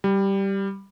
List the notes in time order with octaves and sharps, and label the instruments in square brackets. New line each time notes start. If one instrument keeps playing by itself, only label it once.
[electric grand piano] G3